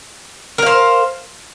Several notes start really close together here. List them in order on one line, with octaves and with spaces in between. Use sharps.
A#4 F5 C5